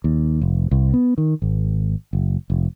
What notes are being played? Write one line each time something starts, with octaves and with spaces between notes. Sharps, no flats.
D#2
F1
C2
B3
D#3
G#1
F#1
F1